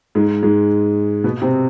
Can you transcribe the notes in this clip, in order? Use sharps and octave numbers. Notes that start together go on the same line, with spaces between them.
G#2 G#3
G#2 G#3
B2 B3
C3 C4